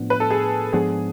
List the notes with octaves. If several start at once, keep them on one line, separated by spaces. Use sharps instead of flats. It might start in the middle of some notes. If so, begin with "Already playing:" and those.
Already playing: A2 F3 B3 D4
B4
A4
G#4
G#2 F3 B3 D4 G#4